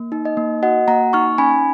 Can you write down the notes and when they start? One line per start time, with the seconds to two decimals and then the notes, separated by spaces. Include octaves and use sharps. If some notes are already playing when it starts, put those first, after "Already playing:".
Already playing: A#3
0.12 D#4
0.25 D#5
0.37 A#3
0.63 F#4 D#5 F#5
0.88 A#3 F#5 A#5
1.13 D#4 C#6 F6
1.38 C#4 G#5 B5